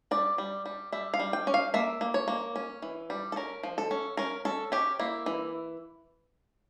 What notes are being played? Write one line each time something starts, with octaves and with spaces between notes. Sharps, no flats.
G3 D5
G3
G3
G3 E5
F5
G3
G5
C#4
F5
A#3 E5
A#3
C#5
A#3
C#4
E3
G3
A4
C#4 A#4
F3
A4
C#4
C#4 A#4
C#4 A4
C#4 G4
A#3 E4
E3